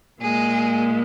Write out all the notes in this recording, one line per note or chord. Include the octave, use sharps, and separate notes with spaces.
A#2 G#3 G#4